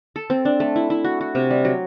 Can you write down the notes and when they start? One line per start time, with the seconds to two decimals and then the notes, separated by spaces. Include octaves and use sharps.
0.16 A4
0.30 C4
0.45 D4
0.60 A3
0.76 E4
0.90 E4
1.05 F#4
1.21 F#4
1.35 C3
1.50 G3
1.65 F#3